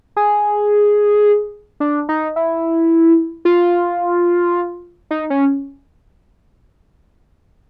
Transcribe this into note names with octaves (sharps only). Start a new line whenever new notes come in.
G#4
D4
D#4
E4
F4
D#4
C#4